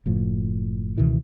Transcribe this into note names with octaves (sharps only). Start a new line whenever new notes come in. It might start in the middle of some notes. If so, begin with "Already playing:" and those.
F#1 A2 F3
C#2 B2 D#3 E3